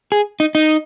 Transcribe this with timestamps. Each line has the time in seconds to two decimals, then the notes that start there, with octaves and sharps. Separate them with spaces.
0.12 G#4
0.40 D#4
0.55 D#4